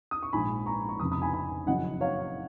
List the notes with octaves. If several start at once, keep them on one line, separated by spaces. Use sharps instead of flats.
D#6
C#6
A#1 G#2 F3 G#5 B5
A#5 C#6
C#6
F1 F2 C#3 B5 D#6
B5 D#6
G#5 B5
G#5 B5
F#1 F#2 F3 D#5 F#5
C#5 F5